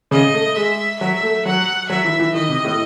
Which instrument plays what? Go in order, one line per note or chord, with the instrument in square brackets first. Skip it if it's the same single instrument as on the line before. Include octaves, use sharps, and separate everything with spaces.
[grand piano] C#3 [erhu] D#5
[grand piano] A3
[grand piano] G#3 [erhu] E5
[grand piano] F#3 [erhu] E5
[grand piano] A3
[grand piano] F#3 [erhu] F#5
[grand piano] F#3 [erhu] E5
[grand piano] E3
E3
[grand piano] D#3 [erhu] D#5
[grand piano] C3
A2